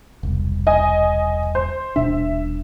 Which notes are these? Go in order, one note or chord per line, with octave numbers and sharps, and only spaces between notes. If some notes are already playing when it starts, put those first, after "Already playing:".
E1 C2
D#5 G#5
C5
D#1 B2 D4 E5